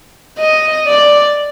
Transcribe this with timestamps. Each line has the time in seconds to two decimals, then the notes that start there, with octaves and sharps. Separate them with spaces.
0.38 D#5
0.87 D5